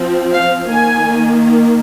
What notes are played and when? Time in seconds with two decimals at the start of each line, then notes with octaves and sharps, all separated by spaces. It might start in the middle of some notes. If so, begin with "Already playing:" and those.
Already playing: F3 C4
0.32 F5
0.70 D#3 A#3 G#5